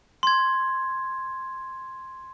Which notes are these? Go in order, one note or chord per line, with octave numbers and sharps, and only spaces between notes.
C6 G#6